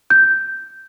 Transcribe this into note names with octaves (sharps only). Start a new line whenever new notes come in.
G6